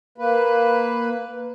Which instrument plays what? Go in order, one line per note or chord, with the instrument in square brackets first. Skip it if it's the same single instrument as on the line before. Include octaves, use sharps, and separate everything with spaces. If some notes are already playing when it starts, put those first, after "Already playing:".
[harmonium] A#3 B4